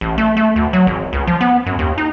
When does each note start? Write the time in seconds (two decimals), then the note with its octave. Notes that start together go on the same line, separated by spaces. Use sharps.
0.01 A1
0.18 A3
0.37 A3
0.56 D2
0.73 F#3
0.87 G#1
1.13 C#2
1.27 F3
1.41 B3
1.66 F#2
1.79 D#2
1.98 D#4